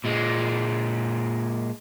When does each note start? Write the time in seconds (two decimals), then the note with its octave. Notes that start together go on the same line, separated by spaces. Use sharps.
0.04 A#2 G#3